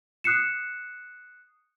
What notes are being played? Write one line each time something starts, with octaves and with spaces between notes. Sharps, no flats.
D#6 F#6 C7 C#7 E7